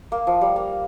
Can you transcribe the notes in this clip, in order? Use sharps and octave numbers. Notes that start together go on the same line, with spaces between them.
A#3
F3
G3
A#3